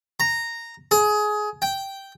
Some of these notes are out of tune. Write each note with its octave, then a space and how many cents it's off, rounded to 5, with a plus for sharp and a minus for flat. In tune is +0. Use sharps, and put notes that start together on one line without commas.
A#5 -10
G#4 +20
G5 -5